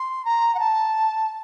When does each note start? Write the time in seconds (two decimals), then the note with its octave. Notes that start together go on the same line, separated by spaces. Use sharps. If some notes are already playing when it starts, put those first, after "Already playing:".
Already playing: C6
0.25 A#5
0.55 F#5
0.59 A5